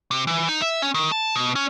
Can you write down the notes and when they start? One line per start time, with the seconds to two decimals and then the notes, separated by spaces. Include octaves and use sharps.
0.11 C3
0.27 E3
0.49 D#4
0.62 E5
0.82 C#4
0.94 D#3
1.12 A5
1.36 B2
1.56 C#4